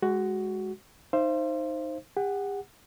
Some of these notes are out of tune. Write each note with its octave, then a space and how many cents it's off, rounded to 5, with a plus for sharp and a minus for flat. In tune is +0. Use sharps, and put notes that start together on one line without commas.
G#3 +0 F#4 +10
D#4 +0 C5 +10 F5 -45
G4 +45 F#5 +5